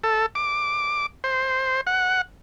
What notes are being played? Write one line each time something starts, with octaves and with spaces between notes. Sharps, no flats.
A4
D6
C5
F#5